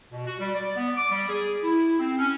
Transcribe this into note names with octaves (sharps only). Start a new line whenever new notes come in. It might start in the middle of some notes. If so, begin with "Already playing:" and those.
B2
F#4
G3
D5
B3
D6
G3
G#4
E4
C4
C#4